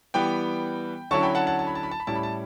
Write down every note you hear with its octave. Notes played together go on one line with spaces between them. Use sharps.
E3 G3 B3 G5 B5
D3 F#3 C#4 E4 A5 C#6
G5 B5
F#5 A5
F#5 A5
A5
B5
A5
B5
A5
B5
A2 G3 C#4 E4 A5
B5
A5